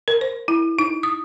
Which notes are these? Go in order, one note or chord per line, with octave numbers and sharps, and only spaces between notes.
A#4
C5
E4
D#4
D#6